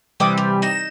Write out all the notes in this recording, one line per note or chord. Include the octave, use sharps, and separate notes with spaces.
C3 E3 G3 G5 D6 D#6
G4
D#4 D#5 E7